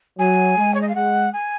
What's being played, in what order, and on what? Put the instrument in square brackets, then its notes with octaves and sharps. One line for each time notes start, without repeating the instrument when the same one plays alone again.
[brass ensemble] F#3 [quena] G#5
[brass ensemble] G#3
[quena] C#5
D#5
F5
[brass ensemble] G#3 [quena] F#5
[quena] G#5